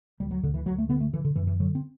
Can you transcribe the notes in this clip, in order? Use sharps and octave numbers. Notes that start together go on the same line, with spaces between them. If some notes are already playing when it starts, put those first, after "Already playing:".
D2 G3
F#3
D2 D3
E3
D2 F#3
A3
D3 B3
A3
D3 E3
D3
F#2 E3
E3
D3 F#3
C4